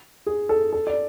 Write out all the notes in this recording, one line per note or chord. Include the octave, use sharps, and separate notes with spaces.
G#4
A4
A4
D5